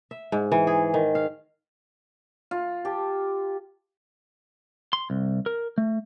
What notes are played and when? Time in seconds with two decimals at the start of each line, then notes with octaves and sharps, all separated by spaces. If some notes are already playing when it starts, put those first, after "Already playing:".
0.11 E5
0.32 G#2
0.52 E3
0.67 G#4
0.94 D#3
1.15 F5
2.51 F4
2.85 G4 A5
4.93 C6
5.10 C2
5.46 A#4
5.78 A3